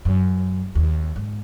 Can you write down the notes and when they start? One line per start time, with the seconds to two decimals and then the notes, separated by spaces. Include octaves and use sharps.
0.05 F#2
0.75 D#2
1.16 G#2